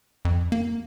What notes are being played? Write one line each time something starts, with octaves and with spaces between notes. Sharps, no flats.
F2
A#3